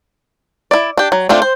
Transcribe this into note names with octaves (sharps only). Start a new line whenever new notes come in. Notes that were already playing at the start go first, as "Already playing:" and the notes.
E4 D5
D4 G4
F#3
A3 C4 D4 F4
C5